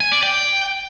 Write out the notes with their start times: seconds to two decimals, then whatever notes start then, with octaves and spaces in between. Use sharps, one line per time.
0.01 G#5
0.12 D5
0.23 G5